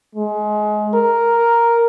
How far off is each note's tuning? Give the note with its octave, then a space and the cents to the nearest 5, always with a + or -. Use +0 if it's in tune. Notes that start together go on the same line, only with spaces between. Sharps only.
G#3 +25
A#4 +0